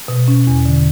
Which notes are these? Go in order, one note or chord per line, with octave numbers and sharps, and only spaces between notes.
B2
C#4
E2
D3